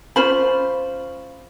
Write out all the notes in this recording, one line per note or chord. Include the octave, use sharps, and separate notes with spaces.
C#4 F4 C5 B5